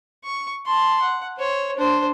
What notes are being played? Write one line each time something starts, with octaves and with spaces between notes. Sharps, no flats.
C#6
A5 C6
F#5
C5 C#5
D4 C5